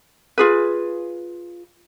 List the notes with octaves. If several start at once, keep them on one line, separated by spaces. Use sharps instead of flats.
F4 G#4 B4